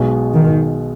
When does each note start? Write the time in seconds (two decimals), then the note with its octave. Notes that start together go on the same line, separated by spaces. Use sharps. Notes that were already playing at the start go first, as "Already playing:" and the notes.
Already playing: B1 B2 G#3
0.34 D#3